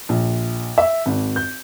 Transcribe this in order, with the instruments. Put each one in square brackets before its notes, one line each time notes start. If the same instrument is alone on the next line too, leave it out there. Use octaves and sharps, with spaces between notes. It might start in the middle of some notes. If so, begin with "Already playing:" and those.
[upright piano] A#1
E5
G#1
G6